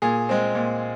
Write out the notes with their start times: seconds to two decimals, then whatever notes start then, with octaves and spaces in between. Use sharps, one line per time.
0.02 A#2 G#4
0.29 G#3 C4
0.55 A#2